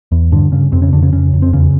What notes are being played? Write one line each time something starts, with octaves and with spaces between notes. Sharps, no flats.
E2
G2 D3 D4
G2 C#3 C#4
F2 C3 C4
C#3 C#4
F2 D3 D4
C#3 C#4
F2 C#3 C#4
F2
C4
E2 C#3 C#4